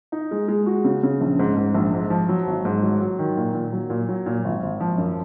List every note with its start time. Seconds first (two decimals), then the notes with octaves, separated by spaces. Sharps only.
0.12 D#4
0.31 G#3
0.48 G#3
0.66 F#4
0.84 C#3
1.03 C#3
1.21 A#1
1.39 G#2
1.57 G#2
1.75 A#1
1.93 G#2
2.10 F3
2.29 F#3
2.47 G#1
2.65 G#2
2.83 F#3
3.01 F#3
3.19 D#3
3.37 A#2
3.54 A#2
3.72 F#3
3.90 A#2
4.09 F#3
4.26 A#2
4.44 G#1
4.63 G#1
4.80 F3
4.98 F#2